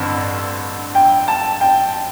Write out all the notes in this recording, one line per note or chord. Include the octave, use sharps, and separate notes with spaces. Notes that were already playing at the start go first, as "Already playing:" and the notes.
Already playing: A1 G2 D3 C4
G5
A5
G5